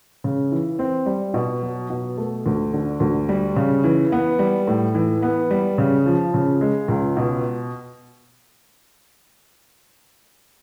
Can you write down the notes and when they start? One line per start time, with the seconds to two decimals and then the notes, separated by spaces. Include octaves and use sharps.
0.24 C#3
0.52 E3
0.79 C4
1.06 G3
1.34 B2
1.62 F#3
1.90 B2
2.17 A3
2.46 D2
2.73 D3
3.00 D2
3.29 G3
3.56 C#3
3.84 E3
4.12 B3
4.39 G3
4.67 A2
4.94 E3
5.22 B3
5.51 G3
5.78 C#3
6.06 F3
6.34 C#3
6.61 G#3
6.88 C#2
7.17 B2